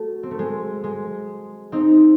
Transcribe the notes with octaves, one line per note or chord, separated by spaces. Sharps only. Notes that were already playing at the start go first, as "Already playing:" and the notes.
Already playing: A3 F#4
C4
A3
G#3
G#3
C4 D#4